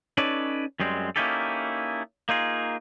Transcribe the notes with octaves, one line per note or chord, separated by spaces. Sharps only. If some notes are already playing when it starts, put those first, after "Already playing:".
C#4 D#4 A4 B4 C#5 D5
F#2 G3 G#3 C4
A#3 C#4 D#4 E4 G4 A4
A#3 D#4 F4 G#4